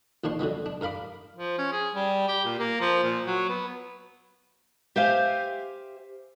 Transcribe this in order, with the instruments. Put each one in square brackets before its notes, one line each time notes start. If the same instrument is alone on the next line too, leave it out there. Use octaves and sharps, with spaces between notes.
[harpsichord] A#1 D#3 D4 C#5 C6
D3 F#3 G#3 B3
D4
G2 A#4 F5 B5 D6
[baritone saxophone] F3
C#4
G#4
G3
G4
A#2
A#3
F3
A#2
F#3
B3
[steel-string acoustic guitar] G4 C5 E5 F5 G#5